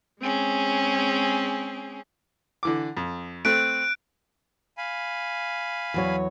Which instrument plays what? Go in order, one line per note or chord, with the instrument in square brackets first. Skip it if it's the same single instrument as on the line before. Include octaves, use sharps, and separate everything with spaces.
[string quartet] G#3 C4 C#4 G#4
[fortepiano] D3 E3 D6
F2
[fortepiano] A3 C4 [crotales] F#6 D7
[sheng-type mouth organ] F5 G#5 B5
[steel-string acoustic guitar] E2 F#3 C#5